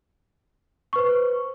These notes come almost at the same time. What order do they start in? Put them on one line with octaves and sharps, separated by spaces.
C#6 B4 C5